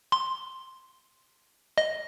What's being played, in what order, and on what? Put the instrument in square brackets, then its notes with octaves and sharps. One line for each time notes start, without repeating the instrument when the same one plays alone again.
[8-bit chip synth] C6
D#5